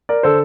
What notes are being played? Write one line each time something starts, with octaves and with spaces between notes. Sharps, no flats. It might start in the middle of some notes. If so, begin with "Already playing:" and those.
A#4 D5
D3 A4 C5